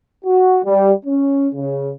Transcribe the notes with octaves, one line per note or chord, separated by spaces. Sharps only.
F#4
G3
C#4
C#3